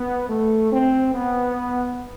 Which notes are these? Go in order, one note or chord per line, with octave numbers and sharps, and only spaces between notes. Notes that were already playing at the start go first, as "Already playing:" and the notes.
Already playing: B3
A3
C4
B3